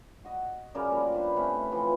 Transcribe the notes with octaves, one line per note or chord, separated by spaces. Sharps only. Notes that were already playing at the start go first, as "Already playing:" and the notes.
F#4 D#5
F#2 C#3 A#4 D5
F3 G3 A#3
D4 E4 B4 C5
C3 A3 C#4 B4
E3 F3 G5